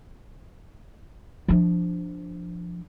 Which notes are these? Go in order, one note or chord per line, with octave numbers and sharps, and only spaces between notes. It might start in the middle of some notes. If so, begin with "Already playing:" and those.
F3 D4